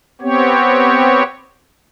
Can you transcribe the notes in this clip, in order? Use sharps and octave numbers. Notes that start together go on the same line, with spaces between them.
B3 C4 G4 C#5